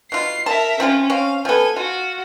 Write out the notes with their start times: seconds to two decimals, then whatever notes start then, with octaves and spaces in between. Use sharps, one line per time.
0.12 B2 F4 C7
0.46 A#4 E5 A5
0.80 F3 C4 C#4 F4
1.10 C4 C#4 F5
1.45 F3 B3 A4 G#5
1.76 F4 F#4